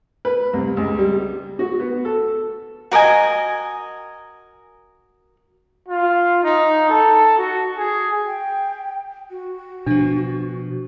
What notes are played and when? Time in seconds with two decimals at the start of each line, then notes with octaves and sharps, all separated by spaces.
0.25 B4
0.53 C2
0.77 C#2
0.99 G3
1.59 F#4
1.80 B3
2.05 A4
2.91 F#4 A#4 D#5 G#5
5.88 F4
6.44 D#4
6.89 A4
7.37 F#4
7.78 G#4
8.27 G5
9.31 F#4
9.86 B2 F3 D4